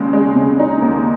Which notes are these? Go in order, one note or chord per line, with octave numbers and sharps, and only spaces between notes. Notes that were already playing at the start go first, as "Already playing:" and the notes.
Already playing: D#2 C#3 G#3
G#3
C#3
D#4
D#2